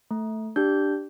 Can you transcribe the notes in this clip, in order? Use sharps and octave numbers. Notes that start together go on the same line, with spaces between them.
A3
D4 G4 G6